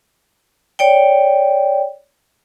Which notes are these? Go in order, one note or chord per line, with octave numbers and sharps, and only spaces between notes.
C#5 D5 G5